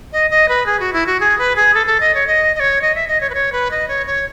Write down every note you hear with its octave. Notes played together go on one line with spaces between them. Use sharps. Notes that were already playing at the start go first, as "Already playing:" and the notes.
D#5
D#5
B4
G#4
F#4
E4
F#4
G#4
B4
G#4
A4
A4
D#5
C#5
D#5
D#5
C#5
D#5
E5
D#5
C#5
B4
C#5
B4
D#5
C#5
C#5